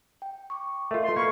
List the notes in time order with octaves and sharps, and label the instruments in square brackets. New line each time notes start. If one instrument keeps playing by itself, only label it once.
[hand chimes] G5
C#6 D6
[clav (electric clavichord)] A3 F4 [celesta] A#4 D#5 E5
[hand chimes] A4 B4 [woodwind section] C6
[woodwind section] B2 B5 C#6 [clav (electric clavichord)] A#3 [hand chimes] A4 F6 G#6